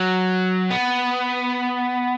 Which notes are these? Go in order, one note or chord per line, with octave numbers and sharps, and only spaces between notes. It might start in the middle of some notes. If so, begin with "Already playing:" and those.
Already playing: F#3
B3